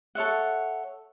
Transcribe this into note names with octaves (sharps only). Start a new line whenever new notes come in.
A4 C#5 E5 F#5